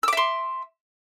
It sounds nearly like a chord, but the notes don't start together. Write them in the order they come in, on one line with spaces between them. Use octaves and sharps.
E6 D6 E5 C6